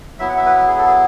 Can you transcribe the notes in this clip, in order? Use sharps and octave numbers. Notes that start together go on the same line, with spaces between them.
F#3 B3 E4 E5
F#5
E5
B4
G#4
A4
G#4